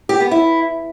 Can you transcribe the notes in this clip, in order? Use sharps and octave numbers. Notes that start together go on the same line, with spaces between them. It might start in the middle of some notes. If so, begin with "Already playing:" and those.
G4
B3
E4